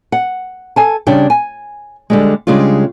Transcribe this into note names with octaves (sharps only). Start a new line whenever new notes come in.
F#5
A4 G#5 A5
C#3 G3 D4 C#5 G5
G#5
D3 G3 G#3
C#3 G3 G#3 D4 F4